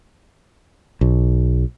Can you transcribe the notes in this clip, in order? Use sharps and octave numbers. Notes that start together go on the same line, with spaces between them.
B1